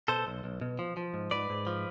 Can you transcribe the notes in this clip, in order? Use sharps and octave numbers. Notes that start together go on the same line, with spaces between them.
B2 A4 C5
B1
B1
B2
F3
F3
G#2
G#2 B4 D5
G#2
F3